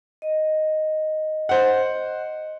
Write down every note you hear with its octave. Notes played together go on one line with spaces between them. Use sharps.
D#5
C5 F#5